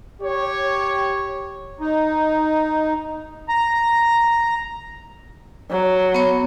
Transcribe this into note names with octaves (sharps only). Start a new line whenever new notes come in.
G4 C#5
D#4
A#5
F#3
B3 C#5